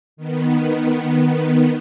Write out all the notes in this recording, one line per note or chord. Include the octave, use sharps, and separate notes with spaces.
D#3 B3